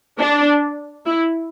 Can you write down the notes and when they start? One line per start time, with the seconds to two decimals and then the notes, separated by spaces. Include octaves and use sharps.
0.18 D4
1.06 E4